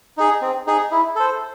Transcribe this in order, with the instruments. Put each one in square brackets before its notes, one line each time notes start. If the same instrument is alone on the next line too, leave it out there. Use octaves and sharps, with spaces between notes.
[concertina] D#4 G#4
C4
D#4 G#4
E4
A4 C5